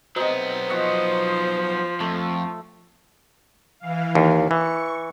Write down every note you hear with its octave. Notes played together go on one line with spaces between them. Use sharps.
C3 F#3 B3 D#4 C5
F3 D#5 F#5 C#6
F2 A3
E3 F5
D#2
E3 C#6